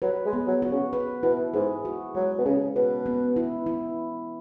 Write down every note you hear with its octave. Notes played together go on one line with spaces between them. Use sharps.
F#3 B4
G#3
B3
F#3
F#4
C#3
B4
B2 E4
G#2 G#4
F#4
F#3 G#3
B2
C#3 C#4
B2 B4
B3
E4
E4